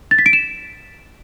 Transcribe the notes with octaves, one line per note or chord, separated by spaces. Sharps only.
A6
B6
D7
E7